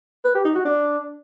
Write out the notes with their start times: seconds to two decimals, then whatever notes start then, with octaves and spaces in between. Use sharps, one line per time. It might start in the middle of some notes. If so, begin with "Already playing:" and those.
0.25 B4
0.35 G4
0.45 D#4
0.55 F#4
0.65 D4